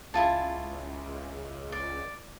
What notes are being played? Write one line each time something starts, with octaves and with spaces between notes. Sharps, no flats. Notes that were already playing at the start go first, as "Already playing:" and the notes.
C#2 E4 F4 A5
D5